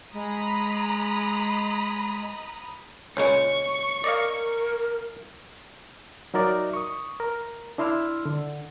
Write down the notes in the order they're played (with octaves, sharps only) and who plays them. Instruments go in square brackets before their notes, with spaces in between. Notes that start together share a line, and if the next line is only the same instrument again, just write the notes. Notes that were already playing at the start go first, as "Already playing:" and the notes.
[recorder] G#3 [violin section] A#5 B5 D#6
[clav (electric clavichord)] C#2 A#2 G#3 [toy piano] C#5 [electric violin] C#6
[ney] A#4 [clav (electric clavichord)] D5 D#5 F5
[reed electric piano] F#3 D#4 F#4 A#4 D5 E5
C#6 D#6
A#4
D4 E4 C6 E6 F6
D3